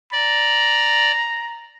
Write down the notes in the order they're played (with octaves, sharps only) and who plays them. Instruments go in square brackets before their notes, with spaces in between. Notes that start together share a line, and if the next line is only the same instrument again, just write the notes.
[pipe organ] D5 [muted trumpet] A#5